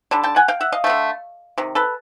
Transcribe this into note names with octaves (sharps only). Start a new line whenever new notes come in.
D3 G3 A5
G5 A5
F#5 G#5
F5 G5
E5 F#5
D#5 F5
F3 A3
D3
C3 D#3
A4 B4